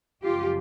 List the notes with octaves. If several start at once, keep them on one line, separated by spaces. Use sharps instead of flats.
F#2 C#3 F3 G#3 F4 G4